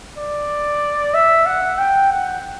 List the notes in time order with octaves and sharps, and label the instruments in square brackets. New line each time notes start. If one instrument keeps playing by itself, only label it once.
[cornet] D5
E5
F#5
G5
F#5